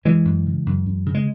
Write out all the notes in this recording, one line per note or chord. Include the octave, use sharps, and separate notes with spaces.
F#2 E3 G#3
F#2
C#3
F#2
F#2
C#3
G#3